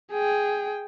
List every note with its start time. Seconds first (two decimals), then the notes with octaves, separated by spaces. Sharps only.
0.13 G#4 G5